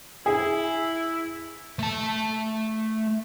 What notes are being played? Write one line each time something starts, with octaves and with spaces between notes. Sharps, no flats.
E4 G#4
A3 A5